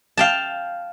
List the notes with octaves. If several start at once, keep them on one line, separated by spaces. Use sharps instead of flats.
F5 G5 A5